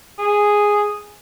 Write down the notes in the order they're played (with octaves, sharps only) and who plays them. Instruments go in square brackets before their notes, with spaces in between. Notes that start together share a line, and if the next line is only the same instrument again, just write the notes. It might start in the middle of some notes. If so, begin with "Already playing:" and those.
[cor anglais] G#4